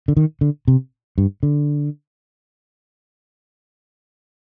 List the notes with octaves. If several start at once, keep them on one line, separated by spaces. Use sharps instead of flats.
D3
D#3
D3
C3
G2
D3